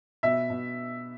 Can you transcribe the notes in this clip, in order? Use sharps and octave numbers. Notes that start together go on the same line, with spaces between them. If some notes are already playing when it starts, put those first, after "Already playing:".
B2 E5
B2